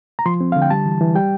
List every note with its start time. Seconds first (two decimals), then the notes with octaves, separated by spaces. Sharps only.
0.19 A#5
0.26 F3 C6
0.41 C4
0.52 D3 F5
0.62 G5
0.70 G3 A5
0.86 E3
1.01 E3
1.15 G3 G5